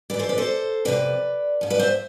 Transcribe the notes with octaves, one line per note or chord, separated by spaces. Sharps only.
G#2 E3 B4 D5
A4 C5
B4 D5
A4 C5
F2 C3 F3 B4 D5
G#2 F3
B4 D5
C5 E5